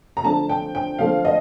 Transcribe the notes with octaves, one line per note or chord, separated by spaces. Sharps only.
A#5
D3 F3 A3 C4 A5
G5
G5
D3 F3 A3 C4 F5
D#5